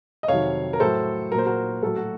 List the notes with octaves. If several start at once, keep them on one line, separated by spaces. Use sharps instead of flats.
D#5
F2 C3 D#3 F#3 C#5 F5
A#4
A2 F#3 A4 C5
A#2 F#3 A#4 C5
F#4 A#4
A2 F#3 A4
F#4